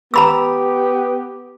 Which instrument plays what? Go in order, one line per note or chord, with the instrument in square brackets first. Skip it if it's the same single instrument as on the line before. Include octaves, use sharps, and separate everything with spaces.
[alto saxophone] B3 [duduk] G4 [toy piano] A#5 B5 E6